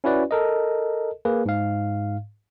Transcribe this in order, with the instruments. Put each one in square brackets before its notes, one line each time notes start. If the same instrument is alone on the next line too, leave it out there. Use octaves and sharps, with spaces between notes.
[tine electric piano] C#4 E4 F#4 B4 D5
A4 A#4 D#5
A#3 G#4 B4
G#2 F5